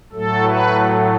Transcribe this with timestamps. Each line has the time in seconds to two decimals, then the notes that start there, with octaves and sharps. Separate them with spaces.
0.13 A2 F#3 A3 A4
0.44 B4